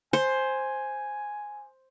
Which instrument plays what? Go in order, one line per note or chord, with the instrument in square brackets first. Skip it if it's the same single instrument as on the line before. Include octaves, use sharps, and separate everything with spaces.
[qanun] C5 [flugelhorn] G#5